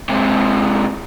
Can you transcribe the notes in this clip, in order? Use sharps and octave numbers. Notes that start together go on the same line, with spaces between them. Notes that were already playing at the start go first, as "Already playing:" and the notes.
C3 G#3